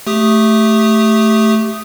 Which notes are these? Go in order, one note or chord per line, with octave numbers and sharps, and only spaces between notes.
A3 G4 D#6